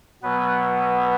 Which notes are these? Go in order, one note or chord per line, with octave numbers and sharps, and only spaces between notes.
B2 F#3 B3 B4